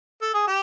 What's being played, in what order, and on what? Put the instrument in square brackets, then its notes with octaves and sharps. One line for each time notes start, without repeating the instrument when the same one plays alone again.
[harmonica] A4
G#4
G4